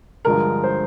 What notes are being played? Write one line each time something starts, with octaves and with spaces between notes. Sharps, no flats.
G2 D3 F3 G#3 A#4
C5